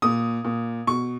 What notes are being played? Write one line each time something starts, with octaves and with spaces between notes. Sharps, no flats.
A#2 D#6
A#2
B2 C#6